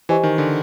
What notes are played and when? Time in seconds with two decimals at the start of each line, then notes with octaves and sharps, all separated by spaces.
0.09 E3 G4 C5 D#5 G#5 C#6
0.23 D#3
0.38 D3